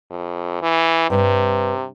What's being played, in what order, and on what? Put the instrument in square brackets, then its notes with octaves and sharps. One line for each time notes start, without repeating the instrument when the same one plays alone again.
[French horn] F2
E3
[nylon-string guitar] G2 [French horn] C3